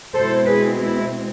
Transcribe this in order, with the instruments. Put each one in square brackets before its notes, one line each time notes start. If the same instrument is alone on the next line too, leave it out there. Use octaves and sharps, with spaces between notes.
[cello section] B2 G#3 C4 E4 A4 C5
G#4 B4
E4